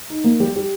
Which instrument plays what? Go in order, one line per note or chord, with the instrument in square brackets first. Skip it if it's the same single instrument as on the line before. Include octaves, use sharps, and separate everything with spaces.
[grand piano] D#4
A#3
G3 G4
G4